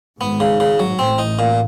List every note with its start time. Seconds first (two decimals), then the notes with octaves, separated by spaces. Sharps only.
0.20 G#1 G#2 B3
0.40 C#3
0.60 C#3
0.80 F#3
0.99 A1 A2 C4
1.18 D#4
1.39 A#2